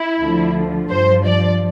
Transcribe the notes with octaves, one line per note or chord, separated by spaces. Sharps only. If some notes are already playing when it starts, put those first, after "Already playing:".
Already playing: E4
D2 D3 F3
G2 F3 C5
D5